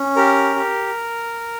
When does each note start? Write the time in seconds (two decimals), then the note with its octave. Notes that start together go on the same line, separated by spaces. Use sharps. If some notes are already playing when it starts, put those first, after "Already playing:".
Already playing: C#4
0.16 G4 A#4
0.56 G4